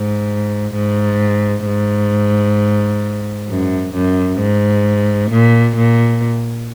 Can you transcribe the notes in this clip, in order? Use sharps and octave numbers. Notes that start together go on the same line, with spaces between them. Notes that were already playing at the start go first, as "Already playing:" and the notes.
Already playing: G#2
G#2
G#2
F#2
F#2
G#2
A#2
A#2